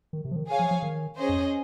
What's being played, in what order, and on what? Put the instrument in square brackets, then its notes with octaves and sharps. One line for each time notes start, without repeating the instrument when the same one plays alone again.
[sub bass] D#3
C3
F3
D#3
[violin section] G#4 C#5 F5 G#5
[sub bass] F3
F3
D#3
[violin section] C#4 G#4 C5 D#5
[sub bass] F2